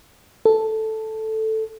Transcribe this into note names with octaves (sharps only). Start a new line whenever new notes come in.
A4